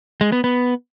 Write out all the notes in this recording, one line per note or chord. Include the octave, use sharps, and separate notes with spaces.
G#3
B3
B3